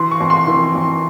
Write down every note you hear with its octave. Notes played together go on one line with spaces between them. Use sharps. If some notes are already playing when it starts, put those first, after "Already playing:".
Already playing: E3 C6
C#6
F2
C6
E3
F2